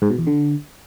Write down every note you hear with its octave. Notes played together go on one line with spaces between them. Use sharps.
G#2
B2
E2
D3